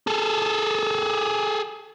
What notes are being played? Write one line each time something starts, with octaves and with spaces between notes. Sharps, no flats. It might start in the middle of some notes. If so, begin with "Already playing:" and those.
G#4 A4